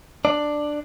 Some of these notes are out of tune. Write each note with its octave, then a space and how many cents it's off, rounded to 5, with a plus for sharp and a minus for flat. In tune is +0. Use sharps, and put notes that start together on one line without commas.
D4 +10 D5 +10